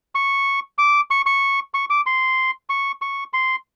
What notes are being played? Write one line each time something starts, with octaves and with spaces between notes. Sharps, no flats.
C#6
D6
C#6
C#6
C#6
D6
C6
C#6
C#6
C6